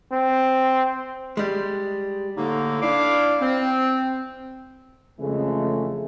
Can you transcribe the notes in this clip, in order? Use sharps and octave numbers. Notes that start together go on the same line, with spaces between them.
C4
G3 G#3
A2 D3 A#3 D#4
D4 E4 F5 D6
C4
F2 C#3 E3 G#3 A3